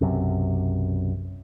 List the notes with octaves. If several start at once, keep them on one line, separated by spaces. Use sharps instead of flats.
B1 F#2 C3